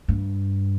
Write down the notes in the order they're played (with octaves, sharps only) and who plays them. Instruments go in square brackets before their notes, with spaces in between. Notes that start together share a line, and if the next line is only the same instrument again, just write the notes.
[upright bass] G2